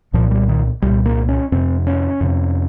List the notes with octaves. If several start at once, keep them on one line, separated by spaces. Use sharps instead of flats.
C2 A#2 F3
G3
D#3
C2 A#2 G3
A#3
C#4
F2 C3 C4
C#4
F2 C3